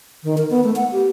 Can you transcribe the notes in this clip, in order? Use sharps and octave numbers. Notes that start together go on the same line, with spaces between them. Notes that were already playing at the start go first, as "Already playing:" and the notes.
D#3
A#4
B3
A3
F#5
G4